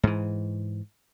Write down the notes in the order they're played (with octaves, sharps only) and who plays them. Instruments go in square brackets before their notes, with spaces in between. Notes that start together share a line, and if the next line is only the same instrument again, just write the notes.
[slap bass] G#2 E3